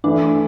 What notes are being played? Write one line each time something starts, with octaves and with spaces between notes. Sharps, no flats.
E3 A3 D4 E4